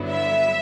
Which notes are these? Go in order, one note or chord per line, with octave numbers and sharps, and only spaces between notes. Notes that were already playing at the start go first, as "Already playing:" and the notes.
Already playing: G2 D3 F#3 B3 E4
E5